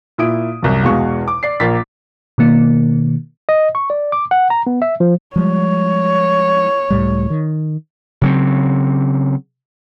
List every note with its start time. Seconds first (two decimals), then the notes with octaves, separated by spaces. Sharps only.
0.18 A#2 E4 D#6 D7
0.62 C2 F#2
0.83 E2 B2 G#3 F5 C#6
1.28 D6
1.43 D5 C7
1.60 A#1 A#3 A6 B6
2.38 B2 D#3 A#3
3.49 D#5
3.75 C#6
3.90 D5
4.12 D6
4.31 F#5
4.50 A#5
4.67 B3
4.82 E5
5.00 F3
5.36 F3 G3 G#3 C#5
6.90 C#2 A2 G3
7.30 D#3
8.22 C#3 F#3 C4